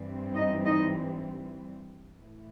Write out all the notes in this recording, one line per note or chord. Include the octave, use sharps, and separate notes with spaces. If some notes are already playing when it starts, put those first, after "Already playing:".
Already playing: G2 E3 G3 C4
D#4 D#5
D#4 D#5
A2 E3 A3